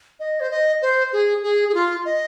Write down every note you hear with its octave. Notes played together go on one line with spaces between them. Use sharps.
D#5
C5
D#5
C5
G#4
G#4
G#4
F4
D#5